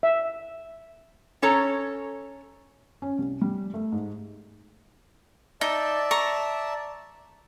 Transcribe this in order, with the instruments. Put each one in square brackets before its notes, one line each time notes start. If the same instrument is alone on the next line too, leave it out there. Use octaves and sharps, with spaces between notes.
[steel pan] E5
[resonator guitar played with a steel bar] C#4 A4 C#5 A#5
[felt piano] C#4
C2
G3
A3
G#2
[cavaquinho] D#4 [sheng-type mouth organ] D5 E5 A5
[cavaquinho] A#5 C#6